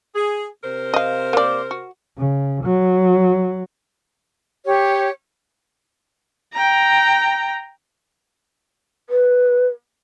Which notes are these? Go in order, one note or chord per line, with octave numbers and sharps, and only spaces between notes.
G#4
C3 A#4 C5
D#5 F5
A#3 D5
F#4
C#3
F#3
G4 C#5
G5 A#5
B4